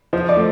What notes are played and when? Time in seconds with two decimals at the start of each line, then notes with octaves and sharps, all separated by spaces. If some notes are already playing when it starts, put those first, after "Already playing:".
0.13 F3 C5
0.29 D5
0.37 A3